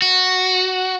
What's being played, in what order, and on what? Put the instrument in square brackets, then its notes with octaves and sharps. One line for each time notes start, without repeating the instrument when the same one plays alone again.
[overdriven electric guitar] F#4